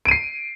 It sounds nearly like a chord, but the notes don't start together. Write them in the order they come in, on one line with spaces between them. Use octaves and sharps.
D7 D#7 C7